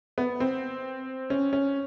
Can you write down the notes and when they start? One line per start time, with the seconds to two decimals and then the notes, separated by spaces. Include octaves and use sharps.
0.18 B3
0.40 C4
1.30 C#4
1.53 C#4